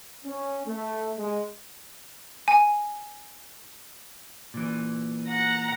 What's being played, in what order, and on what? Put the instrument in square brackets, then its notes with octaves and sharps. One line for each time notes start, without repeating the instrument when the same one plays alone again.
[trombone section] C#4
A3
G#3
[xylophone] G#5
[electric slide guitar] A#2 E3
[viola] F#5 A#5